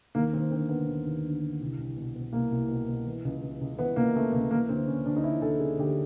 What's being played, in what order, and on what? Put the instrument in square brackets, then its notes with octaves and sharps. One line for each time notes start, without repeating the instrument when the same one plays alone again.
[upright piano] D#2 A#3
D#2 C4
D3 C4
D3 B3
D#2
D#2
D3
D3
C2
C2
B2
B2
C2 A#3
C2
B2
B2
E3
C#2
C#3
C#2
E3 B3
C#2 A#3
C#3 A3
C#2 A#3
E3 A#3
D2 C4
C#3 C#4
D2 D4
D#4
E3 E4
D2 A4
C#3 G#4
D2 G4